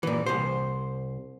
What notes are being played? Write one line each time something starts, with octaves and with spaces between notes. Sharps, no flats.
A#2 E3
C2 C5